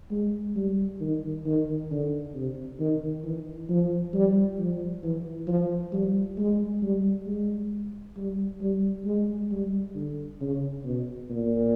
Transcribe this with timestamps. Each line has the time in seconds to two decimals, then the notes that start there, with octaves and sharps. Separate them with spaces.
0.11 G#3
0.56 G3
1.01 D#3
1.46 D#3
1.91 D3
2.34 C3
2.80 D#3
3.24 E3
3.69 F3
4.13 G3
4.59 F3
5.03 E3
5.47 F3
5.92 G3
6.38 G#3
6.82 G3
7.27 G#3
8.17 G3
8.61 G3
9.05 G#3
9.51 G3
9.95 D3
10.41 C#3
10.84 B2
11.30 A#2